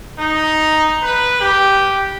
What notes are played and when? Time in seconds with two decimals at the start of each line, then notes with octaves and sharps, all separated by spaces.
0.20 D#4
1.03 B4
1.41 G4